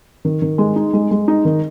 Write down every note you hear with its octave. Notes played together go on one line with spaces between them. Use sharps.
D#3
D#3
G#3
D#4
G#3
G#3
D#4
D#3